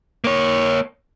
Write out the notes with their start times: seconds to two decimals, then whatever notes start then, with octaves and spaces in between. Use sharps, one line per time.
0.24 A#3 C#5